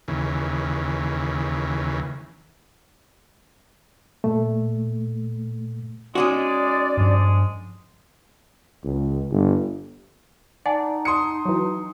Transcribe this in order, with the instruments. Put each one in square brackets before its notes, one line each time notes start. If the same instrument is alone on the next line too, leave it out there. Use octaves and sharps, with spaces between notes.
[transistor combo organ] D#2 C#3 E3
[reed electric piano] A#2 A3
[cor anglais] G#3 [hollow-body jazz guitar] C#4 D#4 F#4 [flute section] D5
[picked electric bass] G2 F3 [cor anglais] G#3
[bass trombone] C#2
G1
[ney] D#4 [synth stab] D5 [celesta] F#5 G#5 A5
[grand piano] C6 D#6 C#7
[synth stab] E3 F#3